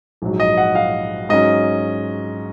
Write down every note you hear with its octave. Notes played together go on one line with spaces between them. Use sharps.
A#1 G#2 F#3
D#5
F#5
F5
G#2 F#3 C#4 D#5